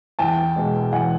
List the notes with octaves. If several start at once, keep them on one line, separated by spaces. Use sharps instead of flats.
E2 G5 A5
B2 G#3
E2 F#5 G#5